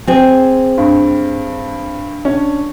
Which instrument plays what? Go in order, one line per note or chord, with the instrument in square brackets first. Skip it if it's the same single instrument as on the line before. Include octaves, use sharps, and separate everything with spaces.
[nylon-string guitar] C4 G#4
[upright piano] G2
C#4 D4